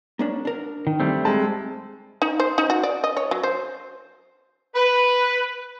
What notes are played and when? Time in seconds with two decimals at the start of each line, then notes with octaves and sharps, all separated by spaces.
0.19 A#3 C#4 D4
0.45 D4 A#4
0.87 D#3
1.00 G3 A3 C4
1.25 G#3 A5
2.22 D#4
2.40 C5
2.58 D#4
2.70 F#4
2.83 D5
3.04 D#5
3.17 C#5
3.31 F#3
3.43 C5
4.75 B4